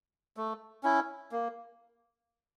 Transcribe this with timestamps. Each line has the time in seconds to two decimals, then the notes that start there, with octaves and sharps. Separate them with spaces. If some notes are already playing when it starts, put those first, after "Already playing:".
0.37 A3
0.83 C#4 E4
1.32 A#3